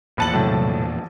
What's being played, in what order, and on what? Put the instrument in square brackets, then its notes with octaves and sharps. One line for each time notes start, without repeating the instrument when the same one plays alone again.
[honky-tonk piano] A#1 A5 F#7 [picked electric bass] E2 A#2 [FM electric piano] B5 F#6 C#7
[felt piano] A2 [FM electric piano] C3 F#3